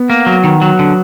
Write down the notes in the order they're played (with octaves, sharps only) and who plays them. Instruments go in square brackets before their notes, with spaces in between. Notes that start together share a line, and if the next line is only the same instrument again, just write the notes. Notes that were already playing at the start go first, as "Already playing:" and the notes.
Already playing: [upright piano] B3
[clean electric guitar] A#3
F#3
D#3
F#3
D3